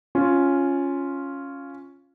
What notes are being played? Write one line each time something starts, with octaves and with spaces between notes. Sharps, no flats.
C#4 F4